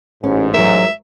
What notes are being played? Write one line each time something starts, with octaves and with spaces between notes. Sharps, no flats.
A1 G#2 C#4
F#3 A#4 E5